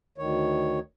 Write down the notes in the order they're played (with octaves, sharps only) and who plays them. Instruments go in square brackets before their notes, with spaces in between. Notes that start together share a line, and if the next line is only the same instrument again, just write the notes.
[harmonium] D2 D#3 C#5